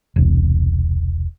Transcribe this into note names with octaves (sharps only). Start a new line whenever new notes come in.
E1 C2